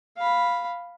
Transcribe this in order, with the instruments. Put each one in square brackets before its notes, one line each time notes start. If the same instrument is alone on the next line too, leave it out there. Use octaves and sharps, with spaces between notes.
[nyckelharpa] F5 B5